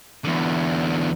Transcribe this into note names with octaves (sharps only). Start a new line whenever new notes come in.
E2 D3